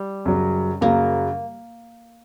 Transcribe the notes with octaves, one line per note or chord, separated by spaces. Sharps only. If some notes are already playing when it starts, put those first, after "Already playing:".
Already playing: G3
F#2 C#3 F#3
F#2 C#3 F#3 A#3